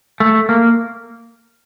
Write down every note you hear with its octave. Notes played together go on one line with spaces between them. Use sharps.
A3
A#3